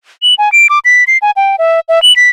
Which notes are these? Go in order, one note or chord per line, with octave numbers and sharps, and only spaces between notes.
F#7
G#5
D7
D6
B6
C7
G#5
G5
E5
E5
F#7
B6